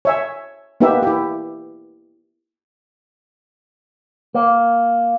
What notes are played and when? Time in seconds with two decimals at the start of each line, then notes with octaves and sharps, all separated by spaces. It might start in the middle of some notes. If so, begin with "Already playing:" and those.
0.05 C#5 E5 G#5
0.80 A#3 B3 D#4 G4 B4 E5
1.03 E4 G4
4.34 A#3